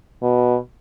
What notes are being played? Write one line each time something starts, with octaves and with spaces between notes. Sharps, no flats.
B2